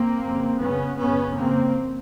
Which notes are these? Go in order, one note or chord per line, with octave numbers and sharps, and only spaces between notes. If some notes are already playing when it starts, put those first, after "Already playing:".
Already playing: A#3 C4
F2 C#3
F#2 C#3 B3 C#4
F#2 C#3 B3 C#4
F2 C#3 A#3 C4